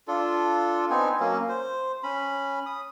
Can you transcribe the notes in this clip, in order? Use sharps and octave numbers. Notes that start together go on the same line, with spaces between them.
D4 F4 A4
B3 C4 D#4 G#5
F#3 A#3 C#4
C5
C#4 B5
D#6